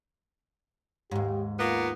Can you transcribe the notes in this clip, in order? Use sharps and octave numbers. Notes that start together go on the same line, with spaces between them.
D#2 G#2 G4
A#3 B3 F4